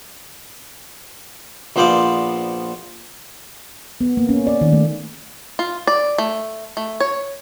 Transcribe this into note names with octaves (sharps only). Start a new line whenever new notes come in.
A#1 F3 B3 C5 D5 F5
B3
A#3
C#4
D5
D#3
A3
F4
D5
A3
A3
C#5